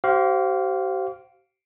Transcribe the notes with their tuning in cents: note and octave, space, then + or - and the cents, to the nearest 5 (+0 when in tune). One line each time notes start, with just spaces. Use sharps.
G4 -45 C5 +0 F5 +0